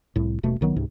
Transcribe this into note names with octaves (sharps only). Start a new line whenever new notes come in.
C2 A2
D#1 B2 A3
C2 D#3 F#3 B3
C#2 G#2 C3